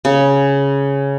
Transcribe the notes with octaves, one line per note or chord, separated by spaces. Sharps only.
C#3